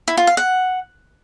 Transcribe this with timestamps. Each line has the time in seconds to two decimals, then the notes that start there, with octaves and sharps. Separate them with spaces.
0.08 E4
0.17 F4
0.27 F5
0.37 F#5